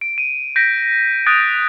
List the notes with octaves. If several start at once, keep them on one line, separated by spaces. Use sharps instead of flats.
D7
D#7
G6 A#6 B6 D7
D#6 F#6 G6 A6 D7